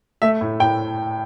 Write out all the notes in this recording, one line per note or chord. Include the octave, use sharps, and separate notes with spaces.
A3 E5
A2
A2 G5